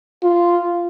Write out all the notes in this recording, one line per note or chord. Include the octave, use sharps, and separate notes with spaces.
F4